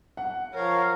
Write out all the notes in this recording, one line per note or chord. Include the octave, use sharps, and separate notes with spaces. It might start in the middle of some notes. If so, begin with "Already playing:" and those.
F#5
F3 A#4 C#5 F5